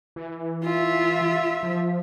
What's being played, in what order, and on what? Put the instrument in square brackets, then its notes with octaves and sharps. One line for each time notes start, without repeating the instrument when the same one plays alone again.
[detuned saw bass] E3
[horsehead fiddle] F4 E5
[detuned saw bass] F3